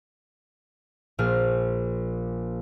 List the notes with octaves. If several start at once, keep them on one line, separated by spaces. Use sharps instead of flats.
A#1 A#2 F6